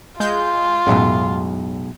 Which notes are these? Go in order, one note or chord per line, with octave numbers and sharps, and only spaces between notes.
G#3 F4 G6
B1 F#2 A2 G#3